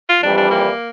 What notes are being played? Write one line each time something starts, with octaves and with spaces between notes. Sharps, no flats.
F4
F2 E3 G3 D4
D4
A#3